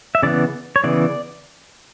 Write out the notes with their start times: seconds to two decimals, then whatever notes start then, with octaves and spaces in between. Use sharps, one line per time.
0.15 E5
0.23 C#3 E3 B3 D5
0.76 C#5
0.84 C#3 E3 B3 D5